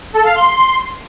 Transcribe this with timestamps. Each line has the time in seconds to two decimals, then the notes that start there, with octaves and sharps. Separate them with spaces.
0.14 A4
0.25 F5
0.36 C6